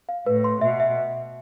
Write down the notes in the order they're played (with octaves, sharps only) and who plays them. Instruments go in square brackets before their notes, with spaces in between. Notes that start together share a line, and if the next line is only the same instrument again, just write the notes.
[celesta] F5
[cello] A2 [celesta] B4
[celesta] C6
[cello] B2 [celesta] E5
[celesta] E5